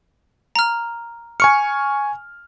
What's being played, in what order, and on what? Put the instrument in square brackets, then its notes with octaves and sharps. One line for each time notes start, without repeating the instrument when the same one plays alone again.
[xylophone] A#5 F6
[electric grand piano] G#5 C#6 F6 [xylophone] C#7